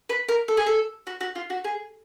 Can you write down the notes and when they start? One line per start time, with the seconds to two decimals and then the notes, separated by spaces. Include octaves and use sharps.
0.09 B4
0.28 A#4
0.48 A4
0.57 G#4
0.67 A4
1.07 F#4
1.21 F#4
1.35 F4
1.50 F#4
1.64 G#4